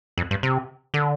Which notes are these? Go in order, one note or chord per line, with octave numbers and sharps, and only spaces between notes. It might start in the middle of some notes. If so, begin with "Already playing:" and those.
F2
G2
C3
D3